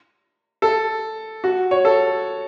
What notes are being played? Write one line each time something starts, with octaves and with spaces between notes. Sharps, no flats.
A4
F#4
C#5
A4